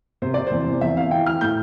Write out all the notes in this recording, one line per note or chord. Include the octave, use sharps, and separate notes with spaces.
C3 C5
C3 D5
C5
E2
C3
E2 E5
E3 F5
E3 G5
E3 F6
A2 G6